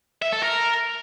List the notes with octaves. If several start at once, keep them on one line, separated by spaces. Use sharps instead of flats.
E5
A4
A#4